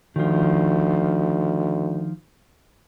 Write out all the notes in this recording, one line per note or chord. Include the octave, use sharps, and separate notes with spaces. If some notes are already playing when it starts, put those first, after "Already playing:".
D2 D#3 F3